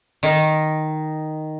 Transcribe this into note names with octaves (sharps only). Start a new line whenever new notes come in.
D#3